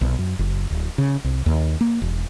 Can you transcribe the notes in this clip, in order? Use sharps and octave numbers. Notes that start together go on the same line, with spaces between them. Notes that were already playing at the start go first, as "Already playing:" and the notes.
B1
F#2
F#1
D1
C#3
C2
D#2
A#3
E1